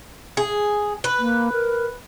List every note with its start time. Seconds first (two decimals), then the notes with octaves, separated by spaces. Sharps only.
0.37 G#4
1.04 B4
1.19 A#3
1.53 A#4